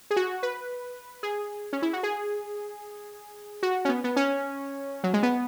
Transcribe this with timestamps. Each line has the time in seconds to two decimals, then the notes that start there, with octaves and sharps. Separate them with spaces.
0.11 G#4
0.16 F#4
0.43 B4
1.23 G#4
1.73 C#4
1.82 E4
1.93 F#4
2.03 G#4
3.63 F#4
3.85 C#4
3.89 B3
4.04 B3
4.16 C#4
5.04 F#3
5.14 G#3
5.23 B3